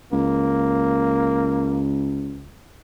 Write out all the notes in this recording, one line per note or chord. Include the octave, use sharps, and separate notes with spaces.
C#2 A#3